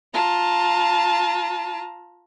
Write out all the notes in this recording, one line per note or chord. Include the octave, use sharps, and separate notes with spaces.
F4 A5 A#5